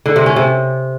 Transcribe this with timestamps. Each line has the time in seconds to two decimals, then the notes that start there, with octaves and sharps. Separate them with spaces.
0.06 D3
0.16 C3
0.26 C#4
0.36 C3